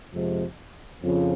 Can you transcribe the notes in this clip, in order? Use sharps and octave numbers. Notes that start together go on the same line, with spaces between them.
F2 C3 F3 G#3
F2 C#3 F3